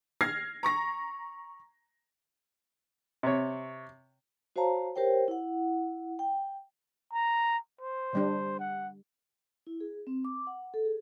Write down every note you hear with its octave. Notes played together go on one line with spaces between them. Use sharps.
F6 G#6 A#6 C7
A#5 C#6 A#6
C3 C#5
F#4 C5 C#5 F5 A5 A#5
G4 A#4 C5 C#5 G5
E4 F#5
G5
A#5
C5
D3 G3 D4
F#5
E4
G#4
C4
D6
F#5
A4
G#4